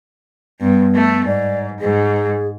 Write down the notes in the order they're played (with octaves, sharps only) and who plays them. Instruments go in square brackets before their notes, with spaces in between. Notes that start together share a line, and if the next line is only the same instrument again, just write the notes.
[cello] G2 [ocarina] B3
[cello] A3
[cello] G#2 [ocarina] D5
[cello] G#2 [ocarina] G#4